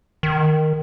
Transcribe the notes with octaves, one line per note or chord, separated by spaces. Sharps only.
D#3